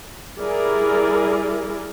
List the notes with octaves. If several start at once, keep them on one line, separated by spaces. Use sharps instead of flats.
G3 E4 G#4 A#4 D5